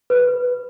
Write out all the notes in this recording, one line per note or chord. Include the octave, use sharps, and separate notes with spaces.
B4